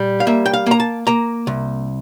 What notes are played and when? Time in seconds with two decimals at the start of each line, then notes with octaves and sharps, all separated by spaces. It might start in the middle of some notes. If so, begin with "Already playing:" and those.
Already playing: A#2 G3
0.20 F5
0.27 A#3 E5
0.46 G5
0.53 F5
0.66 A#3 A#5
0.80 A5
1.07 A#3 A#5
1.47 C2